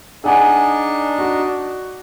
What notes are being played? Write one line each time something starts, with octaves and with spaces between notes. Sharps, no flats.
D4 D#4 G#4 F#5 G#5
F#4